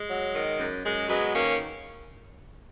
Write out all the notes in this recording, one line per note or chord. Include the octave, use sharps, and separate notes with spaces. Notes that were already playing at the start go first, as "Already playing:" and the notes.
Already playing: G#3
F#3
D#3
F#2
F#2 G#3
F#3 G#3 B3
D#3 A#3 C#4